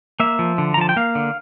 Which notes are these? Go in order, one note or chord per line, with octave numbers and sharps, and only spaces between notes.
A#3 E5
F3
D3
A#5
F3 A5
G5
A#3 F5
D3